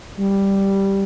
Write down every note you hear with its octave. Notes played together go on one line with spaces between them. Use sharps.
G3